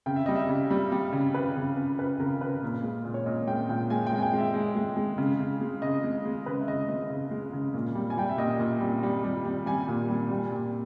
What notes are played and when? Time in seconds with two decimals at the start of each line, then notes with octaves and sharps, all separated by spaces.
0.06 C#3 G5
0.16 E5
0.26 G3 D#5
0.36 E5
0.49 C#3
0.70 G3
0.92 G3
1.12 C#3
1.34 C#3 B4
1.56 C#3
1.77 C#3
1.99 C#3 B4
2.20 C#3 A#4
2.41 C#3 B4
2.62 A#2
2.84 G#3
3.05 A#2
3.14 C#5
3.26 A#2 D#5
3.48 G#3 G5
3.69 A#2 G5
3.90 G#3 G#5
4.07 G5
4.12 G#3
4.18 G#5
4.22 G5
4.33 G#3
4.38 E5
4.54 G#3
4.76 G#3
4.97 G#3
5.18 C#3
5.40 C#3
5.61 G#3
5.82 C#3 D#5
6.04 G#3
6.25 G#3
6.46 C#3 B4
6.61 E5
6.68 C#3 D#5
6.89 G#3 D#5
7.10 C#3
7.31 G#3
7.53 C#3
7.74 A#2
7.95 G3
8.10 G#5
8.18 G3 G5
8.29 E5
8.38 A#2 D#5
8.59 A#2
8.81 G3
9.03 G3
9.24 G3
9.45 G3
9.66 G3 G#5
9.88 A#2
10.09 G3
10.31 G3
10.51 A#2